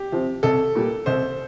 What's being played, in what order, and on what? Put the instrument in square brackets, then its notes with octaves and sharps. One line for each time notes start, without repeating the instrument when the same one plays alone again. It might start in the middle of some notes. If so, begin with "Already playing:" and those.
Already playing: [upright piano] G4
[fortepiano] C3 F3
[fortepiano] C2 [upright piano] A4
[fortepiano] A#2 G3
[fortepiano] C2 [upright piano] C5